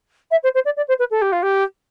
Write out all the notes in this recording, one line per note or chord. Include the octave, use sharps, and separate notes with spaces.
E5
C5
C5
D5
D5
C5
B4
A4
G4
F4
G4